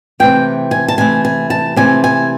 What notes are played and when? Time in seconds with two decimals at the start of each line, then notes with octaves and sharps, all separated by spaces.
0.20 C3 E3 A3 G5
0.71 G#5
0.88 A5
0.98 C3 E3 A3 G#5
1.25 G#5
1.50 A5
1.76 C3 E3 A3 G#5
2.04 G#5